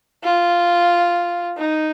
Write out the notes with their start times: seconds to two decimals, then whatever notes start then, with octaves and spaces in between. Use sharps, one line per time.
0.24 F4
1.57 D#4